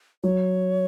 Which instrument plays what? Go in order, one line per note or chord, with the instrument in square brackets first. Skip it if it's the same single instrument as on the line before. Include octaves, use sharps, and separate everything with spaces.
[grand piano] F#3 [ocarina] C#5